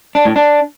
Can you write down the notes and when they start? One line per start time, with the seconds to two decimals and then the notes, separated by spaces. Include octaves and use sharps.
0.15 D4
0.25 A2
0.36 D4